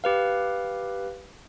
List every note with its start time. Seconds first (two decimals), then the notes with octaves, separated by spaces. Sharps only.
0.04 G4 B4 F5